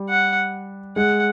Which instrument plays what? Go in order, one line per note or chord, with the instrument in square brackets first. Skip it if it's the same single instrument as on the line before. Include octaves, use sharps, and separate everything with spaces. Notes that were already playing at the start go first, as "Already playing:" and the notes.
Already playing: [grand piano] G3
[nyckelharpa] F#5
[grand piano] G#3 [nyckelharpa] F#5